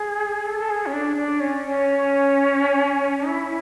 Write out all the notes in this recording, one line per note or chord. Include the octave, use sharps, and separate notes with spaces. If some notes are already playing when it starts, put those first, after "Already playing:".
Already playing: G#4
A4
A4
G#4
C#4
D4
D4
C#4
C#4
E4